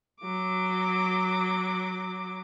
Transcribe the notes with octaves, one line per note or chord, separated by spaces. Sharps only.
F#3 D6